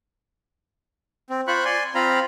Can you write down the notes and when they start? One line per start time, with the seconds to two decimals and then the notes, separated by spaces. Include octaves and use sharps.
1.30 C4
1.47 F4 C5 B5 C#6 F#6
1.65 D5 G#5 C6
1.95 C4 F4 F5 A#5 B5